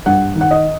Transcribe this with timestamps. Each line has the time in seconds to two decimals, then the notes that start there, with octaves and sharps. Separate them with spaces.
0.06 G2 F#5
0.36 D#3
0.41 F#5
0.51 D#5